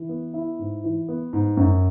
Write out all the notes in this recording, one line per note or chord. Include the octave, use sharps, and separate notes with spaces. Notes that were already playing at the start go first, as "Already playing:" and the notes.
Already playing: E3
B3
E4
G#2
E3
B3
G#2
F#2